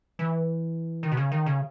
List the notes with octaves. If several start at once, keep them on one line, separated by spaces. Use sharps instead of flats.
E3
D#3
B2
C#3
D#3
C#3